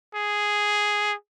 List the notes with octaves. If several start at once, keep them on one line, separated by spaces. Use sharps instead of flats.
G#4